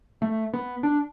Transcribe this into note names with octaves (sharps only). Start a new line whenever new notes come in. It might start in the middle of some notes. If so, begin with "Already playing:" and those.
A3
B3
D4